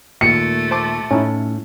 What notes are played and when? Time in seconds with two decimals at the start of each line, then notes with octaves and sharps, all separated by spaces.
0.21 D#2 A#2 A3 C#7
0.71 C5 A5 D6
1.11 A2 C#4 D#4 E4 A5